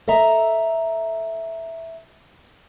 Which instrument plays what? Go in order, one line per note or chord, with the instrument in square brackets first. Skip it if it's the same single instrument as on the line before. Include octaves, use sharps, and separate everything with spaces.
[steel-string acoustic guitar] A4 D#5 E5 A#5